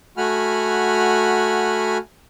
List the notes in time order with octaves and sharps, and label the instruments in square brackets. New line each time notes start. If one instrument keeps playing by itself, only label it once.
[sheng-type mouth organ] A3 F#4 F#5 G#5 B5 F6